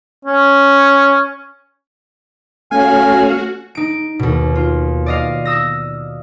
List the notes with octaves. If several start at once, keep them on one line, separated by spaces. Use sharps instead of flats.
C#4
A3 C#4 F#4 F5 G#5
D#4 D7
D#2 B2
F4
D5 D#5 F5
D#6 E6 A#6